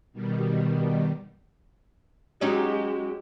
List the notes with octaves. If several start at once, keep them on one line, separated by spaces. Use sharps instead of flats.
B2 D#3 G3
F#3 G#3 C#4 D#4 G4